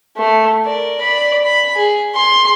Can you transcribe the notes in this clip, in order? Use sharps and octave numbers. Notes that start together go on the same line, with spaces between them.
A3
A#4 D5
D5 B5
B5
G#4
G#4 C6